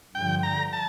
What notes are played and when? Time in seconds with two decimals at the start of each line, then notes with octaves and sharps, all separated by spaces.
0.14 G2 D3 F3 G5
0.43 A#5
0.73 A5